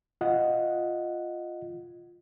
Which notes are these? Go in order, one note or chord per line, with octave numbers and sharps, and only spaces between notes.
F4 D#5 F#5